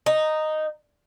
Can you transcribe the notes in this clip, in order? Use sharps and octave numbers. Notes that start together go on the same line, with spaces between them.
D#4